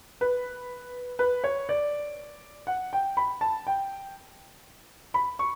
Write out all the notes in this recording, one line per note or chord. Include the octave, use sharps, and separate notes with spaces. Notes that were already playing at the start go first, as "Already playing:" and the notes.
B4
B4
C#5
D5
F#5
G5
B5
A5
G5
B5
C#6